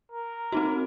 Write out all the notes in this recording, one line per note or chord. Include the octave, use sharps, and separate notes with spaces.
A#4
C4 D#4 F#4